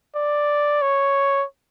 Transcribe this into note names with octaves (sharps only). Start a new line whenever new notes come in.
D5
C#5